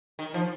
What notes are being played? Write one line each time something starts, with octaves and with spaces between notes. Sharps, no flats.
D#3
F3